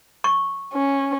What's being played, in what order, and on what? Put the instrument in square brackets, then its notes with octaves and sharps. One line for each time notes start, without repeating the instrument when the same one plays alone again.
[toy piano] C#6
[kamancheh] C#4